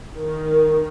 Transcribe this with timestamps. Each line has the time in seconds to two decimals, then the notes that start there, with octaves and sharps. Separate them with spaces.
0.17 D#3